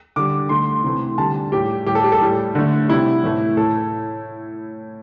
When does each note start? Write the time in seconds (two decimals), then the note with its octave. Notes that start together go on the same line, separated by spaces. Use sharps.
0.16 D3 G3 D6
0.49 D3 A3 C6
0.84 C3 E3 A3
1.18 D3 G3 A5
1.52 A2 G3 G4
1.86 A2 G3 G4
1.95 A4
2.04 G4
2.12 A4
2.21 A2 G3
2.55 D3 A3
2.88 C3 G3 E4
3.23 A2 E3 A3
3.57 A2 A4